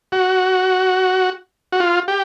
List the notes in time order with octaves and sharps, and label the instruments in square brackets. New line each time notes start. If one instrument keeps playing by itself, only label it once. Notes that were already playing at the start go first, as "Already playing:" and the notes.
[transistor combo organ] F#4
F#4
F4
G4